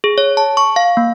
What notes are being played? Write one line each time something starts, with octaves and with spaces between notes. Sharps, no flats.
G#4
C#5
A5
C#6
F5
A#3